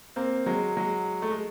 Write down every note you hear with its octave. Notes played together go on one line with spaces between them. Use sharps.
A#3 C4
F#3 G#3
F#3 G#3
A3
G#3